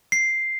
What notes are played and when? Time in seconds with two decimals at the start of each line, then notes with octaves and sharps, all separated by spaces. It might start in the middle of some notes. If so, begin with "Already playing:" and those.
0.12 C7